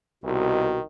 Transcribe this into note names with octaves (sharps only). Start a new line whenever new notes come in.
C2 B2 D#3